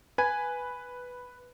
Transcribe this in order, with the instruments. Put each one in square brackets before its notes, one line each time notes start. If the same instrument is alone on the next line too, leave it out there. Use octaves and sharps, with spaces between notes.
[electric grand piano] B4 [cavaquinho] G#5